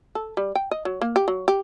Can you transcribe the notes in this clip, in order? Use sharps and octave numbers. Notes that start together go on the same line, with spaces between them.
A4
G3
G5
D#5
F#3
A#3
G4
F#3
G4